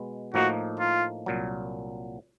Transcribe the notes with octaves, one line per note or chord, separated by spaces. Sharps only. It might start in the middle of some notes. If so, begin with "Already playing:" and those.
Already playing: B2 G#3 B3
A2 F3 A#3 D#4 F#4
F4
C2 A#2 F#3